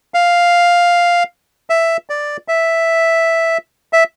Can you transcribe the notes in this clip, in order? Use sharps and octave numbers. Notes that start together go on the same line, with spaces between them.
F5
E5
D5
E5
E5